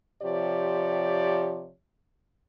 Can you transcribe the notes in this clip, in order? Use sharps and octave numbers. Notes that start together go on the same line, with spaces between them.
C3 F3 G4 C#5 D5